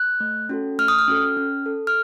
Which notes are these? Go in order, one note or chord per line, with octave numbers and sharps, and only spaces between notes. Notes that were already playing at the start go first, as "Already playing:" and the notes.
Already playing: F#6
A3
C#4 F#4 A4
A3 F6
D#6
F6
C#4 F#4 A4
C#4
A4
F6